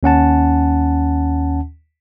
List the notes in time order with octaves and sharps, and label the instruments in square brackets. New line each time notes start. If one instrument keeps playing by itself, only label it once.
[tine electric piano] D#2 C#4 F#5 A5